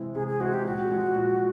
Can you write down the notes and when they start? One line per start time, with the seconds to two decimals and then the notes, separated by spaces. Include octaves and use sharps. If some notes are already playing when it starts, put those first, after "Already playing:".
Already playing: C3 E3 G#3 C4 E4
0.15 C3 G#4
0.27 G#4
0.40 E3 G#3 C4 E4 F#4
0.53 G4
0.65 A#2 F#4
0.91 F3 G#3
1.16 A#2